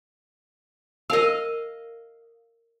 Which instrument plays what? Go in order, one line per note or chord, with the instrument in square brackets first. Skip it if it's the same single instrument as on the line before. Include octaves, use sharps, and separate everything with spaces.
[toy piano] A#4 A5 E6 [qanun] D#5 F5